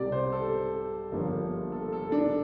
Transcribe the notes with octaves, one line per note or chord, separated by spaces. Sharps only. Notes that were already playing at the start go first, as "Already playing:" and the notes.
Already playing: C2 C3 G3 D5
C5
A4
G1 G2 F3 A#3
A4
A4
D4